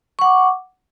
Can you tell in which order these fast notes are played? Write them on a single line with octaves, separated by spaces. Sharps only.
C#6 F#5 D6